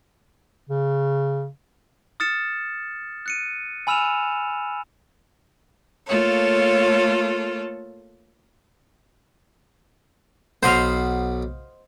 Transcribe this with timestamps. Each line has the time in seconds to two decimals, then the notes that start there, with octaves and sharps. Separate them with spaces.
0.69 C#3
2.20 D#6 F6 A6 C#7 E7
3.26 F#6 C#7 D#7
3.87 G#5 B5 E6 F6 E7 F7
6.07 A3 A#3 F4 A4 C#5
10.63 B1 C5 D#5 F5 F#5 B5